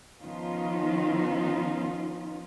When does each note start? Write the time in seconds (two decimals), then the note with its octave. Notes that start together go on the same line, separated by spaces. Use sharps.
0.21 D#3 F3 B3 C#4 D#4 F4